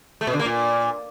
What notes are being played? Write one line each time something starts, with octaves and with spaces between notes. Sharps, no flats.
A3
B2
D3
A#3
A#2